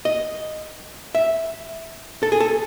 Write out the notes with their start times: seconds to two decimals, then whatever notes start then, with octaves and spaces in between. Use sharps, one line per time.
0.05 D#5
1.15 E5
2.23 A4
2.32 G#4
2.40 A4